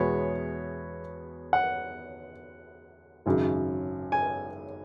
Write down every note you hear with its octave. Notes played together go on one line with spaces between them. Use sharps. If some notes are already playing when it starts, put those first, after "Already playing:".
Already playing: E2 B2 G#3 B3 C#5
F#5
G#1 F#2 C#3
G#5